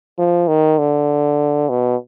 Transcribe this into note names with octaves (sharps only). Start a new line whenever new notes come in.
F3
D#3
D3
B2